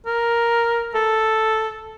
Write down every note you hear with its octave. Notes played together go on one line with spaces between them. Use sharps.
A#4
A4